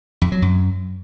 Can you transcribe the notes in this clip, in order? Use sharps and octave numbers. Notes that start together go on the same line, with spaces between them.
F2
F#3
F#2